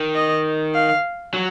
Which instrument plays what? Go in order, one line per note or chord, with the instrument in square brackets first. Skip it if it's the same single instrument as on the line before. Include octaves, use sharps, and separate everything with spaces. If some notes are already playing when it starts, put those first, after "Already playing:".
Already playing: [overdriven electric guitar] D#3
[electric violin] D#5
F5
[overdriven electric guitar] F#3